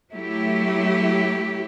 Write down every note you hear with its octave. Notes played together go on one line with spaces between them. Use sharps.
F#3 A3 E4 G4